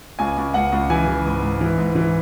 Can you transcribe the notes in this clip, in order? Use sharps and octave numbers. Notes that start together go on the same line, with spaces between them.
C#2 G#5
C#2
C#2 F#5
C#2
E3 G#5
E3
G#2
G#2
E3
G#2
E3